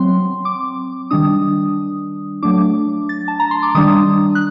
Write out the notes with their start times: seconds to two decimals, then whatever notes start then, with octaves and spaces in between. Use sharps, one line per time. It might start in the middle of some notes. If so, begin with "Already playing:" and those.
Already playing: F#3 C4 C6
0.45 D6
1.11 D#3 G3 D4 D#6
2.43 F#3 A3 D4 D6
3.09 A6
3.28 A5
3.40 A#5
3.51 C6
3.63 D6
3.75 D#3 G3 D4 D#6
4.35 F#6